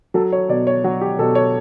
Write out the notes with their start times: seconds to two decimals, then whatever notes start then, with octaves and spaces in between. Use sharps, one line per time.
0.14 F#3 A4
0.32 C#5
0.49 B2 D5
0.67 C#5
0.84 F#3 F#4
1.01 G4
1.19 B2 A4
1.35 C#5